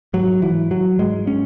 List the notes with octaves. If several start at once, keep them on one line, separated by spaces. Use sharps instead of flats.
G#2 F#3
E3
F#3
G#2 G#3
C#4